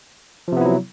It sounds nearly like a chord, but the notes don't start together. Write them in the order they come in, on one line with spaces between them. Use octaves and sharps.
F3 C3 B3 E4 F#3